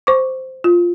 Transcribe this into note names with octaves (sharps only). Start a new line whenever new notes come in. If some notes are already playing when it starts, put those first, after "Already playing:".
C5 C#6 D6
F4